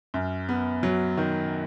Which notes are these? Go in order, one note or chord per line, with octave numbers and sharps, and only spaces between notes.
F#2
B3
F#3
D#3